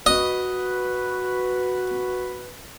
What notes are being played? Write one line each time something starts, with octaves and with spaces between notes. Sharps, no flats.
F#4 B4 D#5